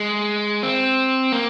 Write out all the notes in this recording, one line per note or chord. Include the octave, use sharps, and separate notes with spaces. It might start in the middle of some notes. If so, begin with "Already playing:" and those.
Already playing: G#3
C4
A#3